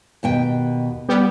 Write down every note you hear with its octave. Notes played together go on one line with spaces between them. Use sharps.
D#2 B2 G5
G3 B3 G4